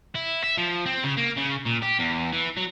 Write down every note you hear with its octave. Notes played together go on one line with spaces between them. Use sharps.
E4
E5
F3
C4
C#3
A#3
C#3
A#2
G4
E2
E3
F#3